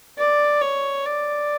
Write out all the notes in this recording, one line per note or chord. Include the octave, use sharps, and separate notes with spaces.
D5
C#5
D5